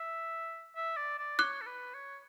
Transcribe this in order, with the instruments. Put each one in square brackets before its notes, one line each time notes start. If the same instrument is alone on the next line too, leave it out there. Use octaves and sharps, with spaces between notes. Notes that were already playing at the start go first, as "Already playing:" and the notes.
Already playing: [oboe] E5
E5
D5
D5
[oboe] C#5 [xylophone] D6 F#6
[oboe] A4
B4
C#5